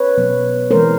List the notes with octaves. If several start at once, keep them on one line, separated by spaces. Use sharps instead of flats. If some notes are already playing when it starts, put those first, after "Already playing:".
Already playing: B4 C#5
B2 F#3 B3
E3 G#3 C4 A#4 C5